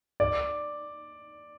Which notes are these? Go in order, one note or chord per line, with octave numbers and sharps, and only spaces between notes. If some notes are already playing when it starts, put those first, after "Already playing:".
D5